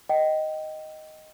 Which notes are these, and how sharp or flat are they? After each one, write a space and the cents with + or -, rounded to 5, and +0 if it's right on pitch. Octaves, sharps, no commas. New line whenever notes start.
D#5 +0 G5 -20